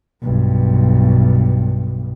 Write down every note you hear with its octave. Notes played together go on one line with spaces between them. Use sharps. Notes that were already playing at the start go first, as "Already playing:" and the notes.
B1 G2